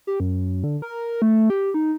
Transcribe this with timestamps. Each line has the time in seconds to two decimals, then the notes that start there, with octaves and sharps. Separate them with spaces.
0.07 G4
0.20 F#2
0.64 D3
0.82 A#4
1.22 A3
1.50 G4
1.74 D#4